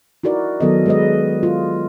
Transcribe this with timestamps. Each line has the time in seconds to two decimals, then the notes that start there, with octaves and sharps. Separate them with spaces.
0.23 D#4 E4 F#4 A#4 D5
0.60 D#3 F#3 B3 A4 A#4 D#5
0.86 G#3 B4 D#5
1.43 F4